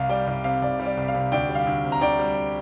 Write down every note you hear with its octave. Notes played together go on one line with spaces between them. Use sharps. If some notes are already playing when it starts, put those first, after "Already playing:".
Already playing: C2 F5
G3 D5 G5
C2 D5
C3 F5
C2 D5
G3
D5
C2
F5
C3
D2 D5 G5
G3
F5
D2
C3
A#5
D2 D5 G5
G3